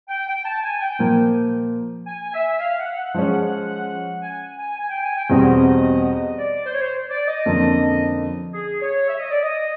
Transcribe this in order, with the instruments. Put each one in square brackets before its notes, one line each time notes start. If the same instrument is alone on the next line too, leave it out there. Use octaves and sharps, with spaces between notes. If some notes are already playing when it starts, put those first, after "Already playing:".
[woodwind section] G5
G5
A5
G#5
G5
[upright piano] A#2 F3 A#3
[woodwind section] G#5
E5
F5
F#5
F#5
[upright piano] F3 G#3 C#4
[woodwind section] G#5
G#5
G#5
G5
G#5
G5
[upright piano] E2 B2 G3 C4 [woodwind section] D#5
[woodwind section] D5
C5
C#5
C5
D5
D#5
[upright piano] F2 D3 F3 A#3 C#4
[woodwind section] G#4
C#5
E5
D#5
D5
D#5